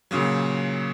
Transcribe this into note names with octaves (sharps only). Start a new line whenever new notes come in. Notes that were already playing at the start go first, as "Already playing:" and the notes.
A#2 C#3 F#3